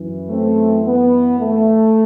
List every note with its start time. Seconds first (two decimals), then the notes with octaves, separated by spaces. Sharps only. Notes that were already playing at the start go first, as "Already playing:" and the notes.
Already playing: F#2 E3
0.29 A3 C4
0.85 B3
1.40 A3